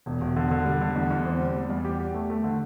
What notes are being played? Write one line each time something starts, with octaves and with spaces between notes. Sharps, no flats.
E1
E1
D3
D3
G3
D3
E2
E2
C4
G3
G3
E2
G4
G4
A3
A3
D3